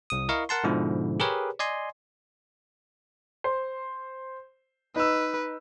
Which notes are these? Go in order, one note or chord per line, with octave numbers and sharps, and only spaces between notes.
C2 D#6
E4 A#4 D#5 F5 C#6
A#4 F#5 A5 C6
G#2 B2 D3 F3 E4
G4 G#4 A#4 B4 C#5
D5 D#5 G#5 C6
C5
D#4 B4 E6